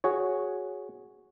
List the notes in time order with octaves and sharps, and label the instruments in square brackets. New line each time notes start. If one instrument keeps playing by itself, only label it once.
[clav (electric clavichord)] F#4 G#4 C#5